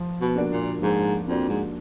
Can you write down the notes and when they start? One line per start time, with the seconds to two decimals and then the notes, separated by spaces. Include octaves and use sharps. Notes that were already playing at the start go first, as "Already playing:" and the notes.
Already playing: F3
0.21 B2
0.35 A#3 D4 F#4 D5
0.52 A#2
0.82 G#2 F3
1.28 F2 A#3 D4 F#4 D5
1.49 G#2